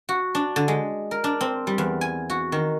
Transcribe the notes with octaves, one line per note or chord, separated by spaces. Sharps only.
F#4
D4
D3
G#3
A#4
D4
C4
G3
E2
G#5
F#4
D#3